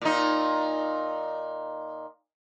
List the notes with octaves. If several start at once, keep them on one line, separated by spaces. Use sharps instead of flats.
A#2 D#4